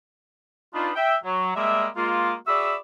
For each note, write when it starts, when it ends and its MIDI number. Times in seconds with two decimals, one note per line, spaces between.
0.74 0.91 62
0.74 0.91 63
0.74 0.91 65
0.74 0.91 71
0.96 1.15 76
0.96 1.15 79
1.24 1.51 54
1.56 1.86 55
1.56 1.86 56
1.56 1.86 58
1.56 1.86 74
1.56 1.86 76
1.96 2.33 56
1.96 2.33 58
1.96 2.33 65
2.47 2.75 66
2.47 2.75 68
2.47 2.75 74
2.47 2.75 76
2.47 2.75 83
2.47 2.75 88